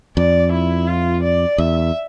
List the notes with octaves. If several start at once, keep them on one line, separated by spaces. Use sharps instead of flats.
F2 D5
E4
F4
D5
E2 E5